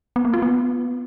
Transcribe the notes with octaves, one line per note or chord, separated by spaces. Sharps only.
B3
A#3
F4
B3